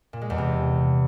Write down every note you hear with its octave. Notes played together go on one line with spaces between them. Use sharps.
A#2
G#3
E2
C3